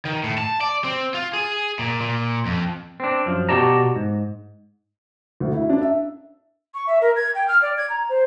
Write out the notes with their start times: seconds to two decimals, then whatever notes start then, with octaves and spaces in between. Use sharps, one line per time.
0.05 D#3
0.24 A2
0.38 A5
0.61 D5
0.85 C4
1.14 F4
1.33 G#4
1.79 A#2
2.01 A#2
2.46 F2
3.00 C4 D4
3.26 F#2 F3
3.49 B2 F#4 G4 D5 A5 A#5
3.96 G#2
5.40 D2
5.54 E4
5.70 D4
5.81 E5
6.74 C#6
6.87 E5
7.02 A#4
7.16 G#6
7.35 G5
7.48 F6
7.62 D5
7.77 G#6
7.90 A#5
8.09 C5